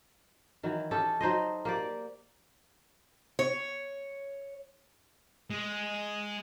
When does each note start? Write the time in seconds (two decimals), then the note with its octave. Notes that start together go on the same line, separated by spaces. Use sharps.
0.63 D#3 E3 F#3
0.91 C#4 G4 A4
1.21 F#3 D#4 C5 D#5
1.65 A#3 G4 D5
3.39 C#5
5.50 G#3